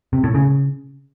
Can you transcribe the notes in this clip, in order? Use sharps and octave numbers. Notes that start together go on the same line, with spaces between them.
C3
A2
C#3